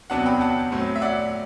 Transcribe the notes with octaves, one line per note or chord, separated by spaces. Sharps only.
E2 C3 F#3 B3 D4 F#5 A5
G5 B5
F#5 A5
A2 F#3 C4
E5
D5 F#5